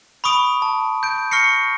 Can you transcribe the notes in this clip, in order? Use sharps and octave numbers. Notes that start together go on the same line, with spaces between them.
B5 C#6 D#6 D7
A5
G6 D7
C#6 F6 A#6 C7 C#7